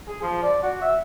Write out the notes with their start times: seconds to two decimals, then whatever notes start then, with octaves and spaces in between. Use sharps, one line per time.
0.08 G#4
0.22 F3
0.43 D5
0.63 F#4
0.81 E5